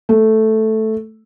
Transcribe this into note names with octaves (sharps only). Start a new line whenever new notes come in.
A3